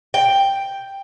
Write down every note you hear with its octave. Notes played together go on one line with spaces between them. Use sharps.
G5